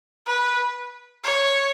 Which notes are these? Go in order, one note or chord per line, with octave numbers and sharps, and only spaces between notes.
B4
C#5